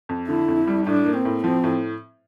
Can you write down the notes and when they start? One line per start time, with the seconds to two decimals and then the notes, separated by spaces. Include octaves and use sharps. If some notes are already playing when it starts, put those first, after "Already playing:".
0.09 F2
0.28 D3 E4
0.48 F2
0.67 G3
0.87 A2 D4
1.06 A#3
1.15 C4
1.25 A2
1.44 F3 C4
1.64 A2